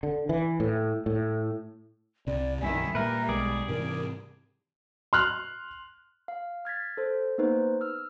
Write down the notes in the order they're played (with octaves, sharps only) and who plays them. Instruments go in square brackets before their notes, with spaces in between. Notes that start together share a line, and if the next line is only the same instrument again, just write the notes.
[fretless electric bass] D3
E3
A2
A2
[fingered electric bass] C2 C3 [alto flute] D5
[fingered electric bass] B1 F#2 G3 [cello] D#3 E4 [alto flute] G#5
[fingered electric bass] A#2 [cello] G3 [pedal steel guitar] A#4 B4 [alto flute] E5
[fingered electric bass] B1 [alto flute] G#3 [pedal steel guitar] G#4 D5
[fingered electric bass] G#2 C3 E3 [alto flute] A#4
[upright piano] C6 F6 F#6
[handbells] F5
F6 G#6 A6 B6
A4 C5
A#3 B3 D#4 B4 C5
E6 F6